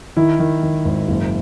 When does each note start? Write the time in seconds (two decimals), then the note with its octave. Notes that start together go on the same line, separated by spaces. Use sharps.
0.17 D#3 E4
0.40 D#3
0.63 D#3
0.85 G#1
1.08 F#1